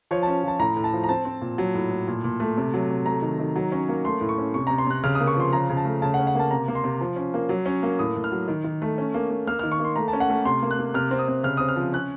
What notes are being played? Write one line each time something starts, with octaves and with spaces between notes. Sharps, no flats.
F3 C#5
A5
C#4
F3 A5
A2 A#5
A2
A5
F3
A#5
C4 A5
C4
A#2
F#3
A2
A2
A#2
A#2
A3
C3
F#3
C3
A3 A#5
D#3
D#3
F#3
C#4
A#3
A3 C6
A2
C#6
C#4
C3 C#6
C3 A#5
C6
C3 F#6
C#3 F6
D#6
A#3
C#6
F3 C6
C#3 A#5
C#3
A5
A3
C#3 A5
F#5
C#4
F#5
A#3 A5
C3 A#5
A#3
C6
C3
F3
C#4
A#3
F#3
C#4
A#3
A2 D#6
A2
F6
F#3
D#3
D#3
A3
C#4
A#3
A#3
A#3 F6
F6
D#3
C#6
A#3
C6
A3 A#5
A5
C#4
F#5
A3
C3 C6
A#3
F#6
A#3
C3 F6
C4
D#6
C3
C#3 F6
C4 D#6
F6
F3
C#4 F#6